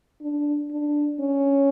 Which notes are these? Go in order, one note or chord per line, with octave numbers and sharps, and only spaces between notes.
D4
D4
C#4